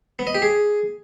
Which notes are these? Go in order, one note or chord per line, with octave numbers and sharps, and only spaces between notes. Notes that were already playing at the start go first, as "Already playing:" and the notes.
B3
D#5
G4
G#4